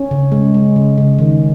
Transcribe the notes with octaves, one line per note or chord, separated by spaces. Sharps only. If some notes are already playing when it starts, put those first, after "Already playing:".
Already playing: C#4
C#3
G#3
G#3
C#3
C#3
D#3